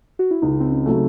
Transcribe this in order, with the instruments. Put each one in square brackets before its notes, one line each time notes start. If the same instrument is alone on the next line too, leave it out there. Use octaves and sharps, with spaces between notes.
[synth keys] F#4
E4
[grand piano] C#2 [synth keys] D#4
[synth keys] C4
C#4
[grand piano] C#3 F#3 A3